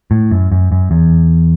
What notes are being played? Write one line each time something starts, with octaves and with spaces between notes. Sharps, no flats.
A2
F#2
F#2
F#2
E2